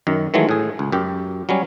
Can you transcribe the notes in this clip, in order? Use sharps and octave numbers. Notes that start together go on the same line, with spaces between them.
F#2 D#3
D#3 E3 F#3 G#3 A3
A2 G#4
C#2
F#2 G4
F#3 G3 C#4